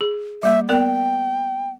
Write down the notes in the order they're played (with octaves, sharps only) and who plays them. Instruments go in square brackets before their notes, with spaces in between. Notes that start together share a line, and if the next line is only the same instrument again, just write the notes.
[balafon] G#4
[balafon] G3 A#3 [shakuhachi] E5
[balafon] B3 A#4 D5 [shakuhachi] G5